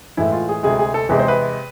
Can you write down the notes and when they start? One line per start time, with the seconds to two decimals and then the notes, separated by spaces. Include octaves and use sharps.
0.17 A2 E3 G#3 E4
0.32 F4
0.49 G#4
0.63 D2 C3 G#3 G#4
0.79 G#4
0.94 A4
1.09 E2 C3 G#3 B4
1.19 C5
1.28 B4